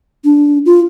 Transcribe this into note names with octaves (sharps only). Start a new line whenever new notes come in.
D4
F4